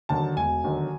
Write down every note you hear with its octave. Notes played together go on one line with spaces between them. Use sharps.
D#2 D3 F#3 A5
E1 G#5
D#2 D3 F#3